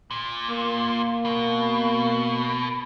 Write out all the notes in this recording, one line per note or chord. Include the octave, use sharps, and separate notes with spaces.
A#2
A#3
B2